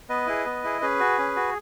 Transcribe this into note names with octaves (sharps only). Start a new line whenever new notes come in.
B3 B4 D#5
E4 G#4
B3
E4 G#4
C#4 G#4 B4
F#4
C#4
F#4